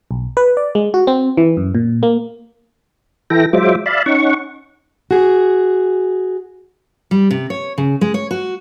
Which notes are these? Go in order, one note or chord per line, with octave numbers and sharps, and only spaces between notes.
B1
B4
D5
G#3
F#4
C4
E3
F#2
A#2
A#3
E3 E4 A4 G5 A#6
F#3 G#3 F4 C5 E5 D6
D5 E5 F5 A5 B5
C#4 D#4 F#5 C#6
F#4 G#4
G3
C3
C#5
C#3
G#3
C#5
F#4